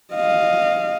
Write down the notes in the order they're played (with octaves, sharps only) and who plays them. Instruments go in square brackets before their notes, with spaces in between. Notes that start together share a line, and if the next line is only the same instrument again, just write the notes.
[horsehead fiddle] D#5 F5